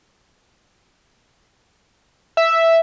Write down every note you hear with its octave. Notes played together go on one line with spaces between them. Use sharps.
E5